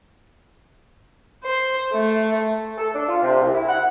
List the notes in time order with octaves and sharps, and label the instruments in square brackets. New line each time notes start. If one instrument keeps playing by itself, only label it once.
[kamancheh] C5
A3
[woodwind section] A4
D4
F4
C3
C2
E4
F#5